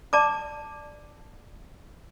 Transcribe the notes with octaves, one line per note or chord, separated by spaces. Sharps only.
D5 A5 A#5 D6